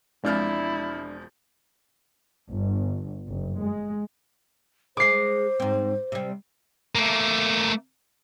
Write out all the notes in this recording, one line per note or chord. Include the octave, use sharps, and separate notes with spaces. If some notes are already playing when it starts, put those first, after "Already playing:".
E1 F3 G#3 C4 D4 E4 F6
G1
F#1
G#3
G#3 G#4 C5 D6 C7
G#2 C4
C3 G3
A3 A#3